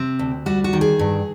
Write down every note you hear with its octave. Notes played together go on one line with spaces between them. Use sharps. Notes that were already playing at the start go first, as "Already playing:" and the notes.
Already playing: C3 C4
D2
G3 F#4
F#4
D#3
G#4
G2